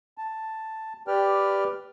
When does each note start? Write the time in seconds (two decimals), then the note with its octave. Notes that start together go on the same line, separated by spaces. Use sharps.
0.18 A5
1.07 G4 B4 D5 G5 F6